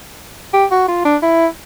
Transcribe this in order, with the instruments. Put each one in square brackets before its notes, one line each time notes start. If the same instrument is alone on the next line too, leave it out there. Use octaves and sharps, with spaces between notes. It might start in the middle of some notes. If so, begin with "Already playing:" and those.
[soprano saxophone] G4
F#4
F4
D4
E4